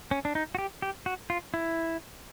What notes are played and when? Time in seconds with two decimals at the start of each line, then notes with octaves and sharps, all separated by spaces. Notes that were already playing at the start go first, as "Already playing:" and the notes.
0.11 C#4
0.25 D4
0.35 D#4
0.55 F#4
0.59 G4
0.82 G4
1.06 F#4
1.30 F4
1.54 E4